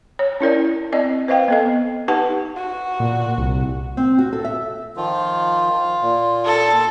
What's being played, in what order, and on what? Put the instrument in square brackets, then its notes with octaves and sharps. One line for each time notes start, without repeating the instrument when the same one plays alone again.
[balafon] C#5
C#4 E4 A#4 D5
C4 D5 D#5
B4 C5 D#5 F5 G5
B3 A4 D#5
D#4 G4 B4 F#5 A5
[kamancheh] F#4
[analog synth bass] A#2
C2
[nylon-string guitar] C4
F#4
A4
E5
[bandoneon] D#3 F3 [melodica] F4
[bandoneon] A#2
[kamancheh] A4